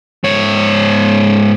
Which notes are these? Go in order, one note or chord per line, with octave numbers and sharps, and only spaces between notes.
G#2 C#5